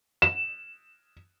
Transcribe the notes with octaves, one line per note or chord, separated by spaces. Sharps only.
E7